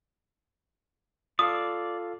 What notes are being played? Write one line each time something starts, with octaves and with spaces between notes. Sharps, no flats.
F4 A4 D5 F5 D#6